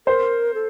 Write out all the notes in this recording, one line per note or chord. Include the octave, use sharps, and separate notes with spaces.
A#4 C5
A4